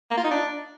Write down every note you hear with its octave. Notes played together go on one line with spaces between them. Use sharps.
A#3
F4
D#4
D4